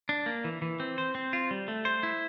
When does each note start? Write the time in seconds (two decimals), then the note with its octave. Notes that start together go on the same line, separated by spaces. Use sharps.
0.09 D4
0.26 A#3
0.44 E3
0.62 E3
0.80 C4
0.98 C5
1.15 C4
1.33 F4
1.51 G3
1.68 A3
1.85 C5
2.03 E4